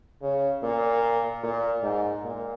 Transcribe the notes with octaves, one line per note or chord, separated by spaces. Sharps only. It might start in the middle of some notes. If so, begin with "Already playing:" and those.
C#3
A#2
A#2
G#2
A#2